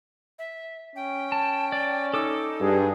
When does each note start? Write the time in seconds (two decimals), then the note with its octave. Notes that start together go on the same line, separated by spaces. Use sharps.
0.39 E5
0.96 C#4 G5
1.32 A5
1.72 D5
2.14 D#4 A4 D6 E6
2.61 G2 G#4